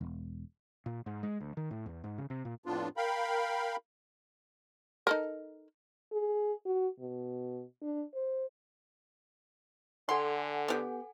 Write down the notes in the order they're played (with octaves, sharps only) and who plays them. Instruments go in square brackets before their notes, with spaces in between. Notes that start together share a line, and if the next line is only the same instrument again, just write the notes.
[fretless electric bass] E1
[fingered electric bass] A#2
G#2
G#3
D2
D#3
A2
E2
G#2
C#3
C3
A#2
[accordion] F2 A2 B3 D4 F4
A#4 F5 G5 B5
[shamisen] D#4 A4 A#4
[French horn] G#4
F#4
B2
D4
C5
[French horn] D3 [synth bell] A4 F#5 G#5 [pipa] C6
[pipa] B3 G4